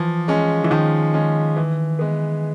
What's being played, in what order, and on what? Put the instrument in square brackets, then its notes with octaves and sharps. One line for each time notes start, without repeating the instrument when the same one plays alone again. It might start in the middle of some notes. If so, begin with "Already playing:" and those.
Already playing: [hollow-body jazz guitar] E3 [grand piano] F3
[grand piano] G#3 C#4
[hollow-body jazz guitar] E3
[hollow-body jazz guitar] D#3 [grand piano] F3
[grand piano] G#3 C#4
E3
G#3 B3